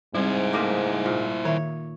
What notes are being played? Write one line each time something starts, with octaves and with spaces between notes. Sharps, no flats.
G#2 G3 C4 E4 C5
A3 A#3 D#4 C6 D6
A#2
D#3 C#5 E5